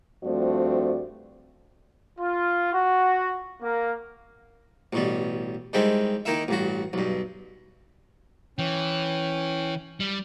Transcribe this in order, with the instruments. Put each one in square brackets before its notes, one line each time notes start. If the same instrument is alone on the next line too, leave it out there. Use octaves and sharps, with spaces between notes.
[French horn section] G2 F3 A3 C4 F#4 D5
[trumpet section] F4
F#4
A#3
[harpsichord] A1 B2 G3
D#3 G3 G#3 C4 E4
D#3 A#3 D#4 E4 E5
A1 G2 F#4
B1 G2
[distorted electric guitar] E3 [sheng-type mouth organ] C#4 G5
[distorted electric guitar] G3